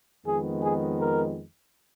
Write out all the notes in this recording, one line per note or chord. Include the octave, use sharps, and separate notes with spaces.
F2 D#3 G#3 B3 G#4
G#4
A#4